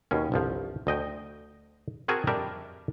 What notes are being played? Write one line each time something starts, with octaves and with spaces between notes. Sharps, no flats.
D#2 B2 C#4
G1 C2 F3
D2 D#5 G5
C4 F#4 G#4 A#4 G#5 A5
F2 G3 D4 A#4 D5 E5